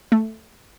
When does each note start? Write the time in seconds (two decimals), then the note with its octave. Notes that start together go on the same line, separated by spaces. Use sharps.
0.12 A3